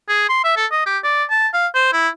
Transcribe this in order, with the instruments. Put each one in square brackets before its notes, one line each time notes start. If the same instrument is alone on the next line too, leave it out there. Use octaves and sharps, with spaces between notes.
[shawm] G#4
C6
E5
A4
D#5
G4
D5
A5
F5
C5
E4